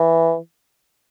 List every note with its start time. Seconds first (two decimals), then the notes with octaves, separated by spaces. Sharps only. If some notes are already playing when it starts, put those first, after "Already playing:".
Already playing: E3